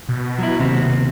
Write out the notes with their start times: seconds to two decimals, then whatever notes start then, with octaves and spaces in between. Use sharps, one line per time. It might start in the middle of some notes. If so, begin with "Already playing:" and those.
0.09 B2
0.39 F#3 E4
0.60 D#2 C3 C4